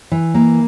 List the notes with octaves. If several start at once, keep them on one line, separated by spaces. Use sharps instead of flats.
E3
A#3